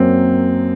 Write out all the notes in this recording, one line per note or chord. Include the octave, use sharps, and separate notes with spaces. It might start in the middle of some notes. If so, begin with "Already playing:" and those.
Already playing: F#2 F#3 A#3 C4